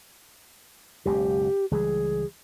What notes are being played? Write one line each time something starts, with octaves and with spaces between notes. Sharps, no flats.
F#1 C#2 B2 G4
C#2 E3 G3 G#4